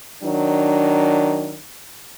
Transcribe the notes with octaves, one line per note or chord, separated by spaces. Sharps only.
D#3 F#3 D4